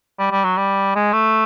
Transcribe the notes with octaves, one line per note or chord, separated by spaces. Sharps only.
G3
G3
F#3
G3
G#3
A3